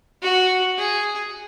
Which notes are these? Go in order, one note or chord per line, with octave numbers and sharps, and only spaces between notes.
F#4
G#4